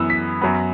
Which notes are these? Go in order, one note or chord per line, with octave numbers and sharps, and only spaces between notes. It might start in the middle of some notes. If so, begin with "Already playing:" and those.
Already playing: F#2 E3 B3 E6
B6
F#2 F#3 B3